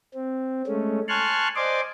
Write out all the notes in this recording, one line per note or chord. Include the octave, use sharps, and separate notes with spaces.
C4
G#3 A3 C#4
G#5 A5 C6 C#6 F6 F#6
C5 D5 D#5 G#5 C6 D6